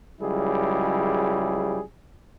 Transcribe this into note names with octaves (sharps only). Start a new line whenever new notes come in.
C#2 F#3 G3 E4 G#4